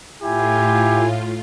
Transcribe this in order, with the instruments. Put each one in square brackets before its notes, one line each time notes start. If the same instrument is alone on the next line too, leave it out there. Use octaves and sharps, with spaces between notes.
[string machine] A2 F4 [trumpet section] E4 G4 G#5